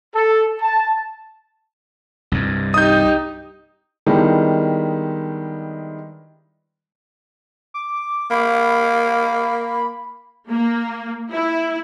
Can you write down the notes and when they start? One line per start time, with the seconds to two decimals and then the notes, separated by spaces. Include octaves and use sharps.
0.15 A4
0.62 A5
2.32 C2 G2
2.74 D#4 G4 D#6 G6
4.06 D#3 G3 G#3 B3 D4 E4
7.74 D6
8.31 A#3 B5
10.49 A#3
11.31 E4